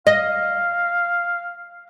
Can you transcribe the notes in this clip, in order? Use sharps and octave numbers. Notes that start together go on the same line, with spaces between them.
D#5 F5